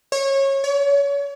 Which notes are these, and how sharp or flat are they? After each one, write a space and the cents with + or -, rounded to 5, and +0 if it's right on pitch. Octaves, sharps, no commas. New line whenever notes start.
C#5 -25
C#5 +30